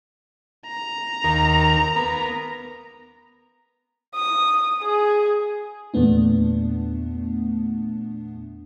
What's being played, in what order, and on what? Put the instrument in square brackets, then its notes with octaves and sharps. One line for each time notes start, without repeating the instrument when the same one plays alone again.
[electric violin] A#5
[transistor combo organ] D#2 A#4
B3 A#4
[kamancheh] D#6
G#4
[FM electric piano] E2 A#2 A3 B3 D4